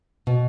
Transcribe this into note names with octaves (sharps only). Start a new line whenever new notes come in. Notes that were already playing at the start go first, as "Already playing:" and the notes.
B2